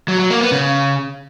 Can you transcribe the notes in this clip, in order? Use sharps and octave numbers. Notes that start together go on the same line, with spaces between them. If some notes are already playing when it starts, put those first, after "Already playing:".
F#3
F#3
A#3
B3
C#3